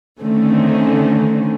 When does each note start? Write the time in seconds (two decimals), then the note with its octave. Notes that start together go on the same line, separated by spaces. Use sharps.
0.22 D3 D#3 A3 C4 C#4